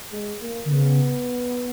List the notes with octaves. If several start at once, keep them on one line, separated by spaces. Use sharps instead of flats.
G#3
A#3
D3
C#3 B3